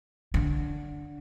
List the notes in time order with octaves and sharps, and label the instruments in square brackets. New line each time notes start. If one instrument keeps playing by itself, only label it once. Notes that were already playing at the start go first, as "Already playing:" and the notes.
[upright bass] D3